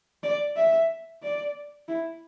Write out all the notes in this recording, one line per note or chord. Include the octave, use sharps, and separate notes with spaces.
D5
E5
D5
E4